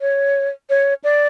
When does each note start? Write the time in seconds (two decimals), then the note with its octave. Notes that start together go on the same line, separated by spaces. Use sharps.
0.01 C#5
0.70 C#5
1.04 D5